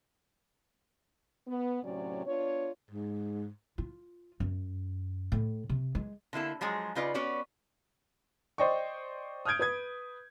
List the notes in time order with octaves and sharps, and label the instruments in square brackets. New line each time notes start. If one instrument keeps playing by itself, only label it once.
[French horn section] B3
D2 A2 C3 F#3 C#4 D5
B3 D4 F4 C#5
[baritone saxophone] G#2
[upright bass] F4
F#2
A2
C3
G#3
[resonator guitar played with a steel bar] D3 A#3 E4 A4
F3 F#3 G#3 G#4
C#3 D#4 F4 B4 D5
B3 C#4 F#4 C#5 D5
[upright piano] C5 D5 D#5 G5 C#6
D#6 F6 G6 G#6 D7
B4 D#6 G#6